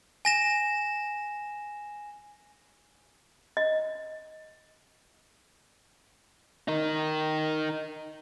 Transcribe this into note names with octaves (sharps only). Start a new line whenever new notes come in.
G#5 A#6 E7
D#5
D#4 A#4